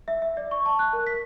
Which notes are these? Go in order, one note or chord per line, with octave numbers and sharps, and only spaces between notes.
E5
E5
D5
C#6
A5
F#6
A#4
B6